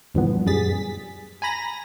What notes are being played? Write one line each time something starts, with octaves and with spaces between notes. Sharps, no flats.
D2 G2 A#2 E3 F3 B3
F#2 G3 G#4 A6 B6
G#5 A#5 B5 A#6